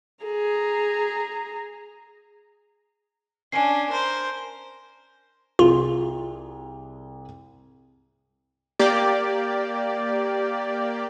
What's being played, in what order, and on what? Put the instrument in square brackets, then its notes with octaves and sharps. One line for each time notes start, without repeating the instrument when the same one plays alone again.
[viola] G#4 A#5
[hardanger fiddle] C#4 D4 [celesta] G#5 C7
[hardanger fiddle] A#4 C5
[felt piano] C2 G#4 [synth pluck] F4
[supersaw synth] A#3 G4 D5